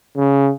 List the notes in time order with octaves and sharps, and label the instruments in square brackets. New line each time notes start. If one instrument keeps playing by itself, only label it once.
[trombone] C#3